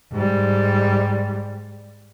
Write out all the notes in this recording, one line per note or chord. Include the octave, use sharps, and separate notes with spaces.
G#2 G3